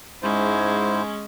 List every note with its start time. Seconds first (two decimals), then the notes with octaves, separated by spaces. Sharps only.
0.23 G#2 G#3 C#4 E4 C5